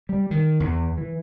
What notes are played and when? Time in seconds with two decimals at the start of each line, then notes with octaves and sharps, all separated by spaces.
0.09 G3
0.31 D#3
0.60 E2
0.98 E3